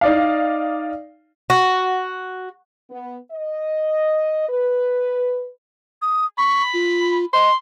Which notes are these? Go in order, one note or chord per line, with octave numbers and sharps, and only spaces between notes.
D#4 D5 F5
F#4
B3
D#5
B4
D#6
B5 C#6
F4
D#5 C6